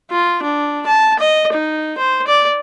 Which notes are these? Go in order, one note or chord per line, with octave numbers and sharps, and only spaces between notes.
F4
D4
A5
D#5
D#4
C5
D5